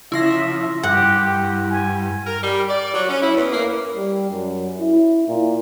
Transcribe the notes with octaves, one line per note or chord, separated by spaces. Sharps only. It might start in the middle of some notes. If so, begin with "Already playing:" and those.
C#3 F3 E4 E5 C6 A#6
G2 G4 F#5
G#5
A#4
G3
D5
F#3
C#4
E4
E2
A#3
G3
F#2
E4
A#2